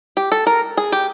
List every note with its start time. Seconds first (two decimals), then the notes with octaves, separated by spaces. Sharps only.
0.17 G4
0.32 A4
0.47 A#4
0.77 G#4
0.92 G4